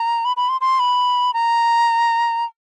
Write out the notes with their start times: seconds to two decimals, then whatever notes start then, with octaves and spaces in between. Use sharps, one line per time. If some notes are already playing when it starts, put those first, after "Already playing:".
Already playing: A#5
0.25 B5
0.37 B5
0.49 C6
0.61 C6
0.79 B5
1.34 A#5